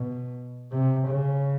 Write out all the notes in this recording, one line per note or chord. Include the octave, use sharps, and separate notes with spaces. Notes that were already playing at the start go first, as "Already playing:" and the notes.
Already playing: B2
C3
C#3